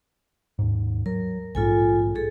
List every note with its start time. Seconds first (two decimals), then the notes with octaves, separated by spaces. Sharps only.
0.59 D#2 G#2
1.06 F#3 A#4
1.55 A#1 G#2 F4 A4 G#5
2.15 G#4 A4